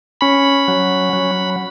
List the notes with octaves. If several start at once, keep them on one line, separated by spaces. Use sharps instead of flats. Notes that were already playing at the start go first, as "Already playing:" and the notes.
C#4 B5
F#3
F#3